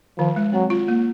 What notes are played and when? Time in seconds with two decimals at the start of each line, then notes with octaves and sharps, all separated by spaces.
0.18 D#3 F3
0.36 G#3
0.53 F#3 C4
0.70 F4
0.88 A#3